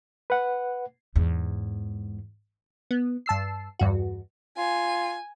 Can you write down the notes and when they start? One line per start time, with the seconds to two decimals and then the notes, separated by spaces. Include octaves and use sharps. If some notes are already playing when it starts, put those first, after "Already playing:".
0.30 B4 F#5
1.16 E2 G#2
2.91 B3
3.26 G2 A5 E6 C7
3.79 E2 G2 F#4
4.58 F4 G#5